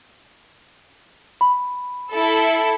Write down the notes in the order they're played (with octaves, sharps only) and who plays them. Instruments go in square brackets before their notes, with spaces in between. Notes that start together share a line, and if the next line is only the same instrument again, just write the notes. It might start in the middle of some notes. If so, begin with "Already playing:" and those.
[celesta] B5
[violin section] E4 A4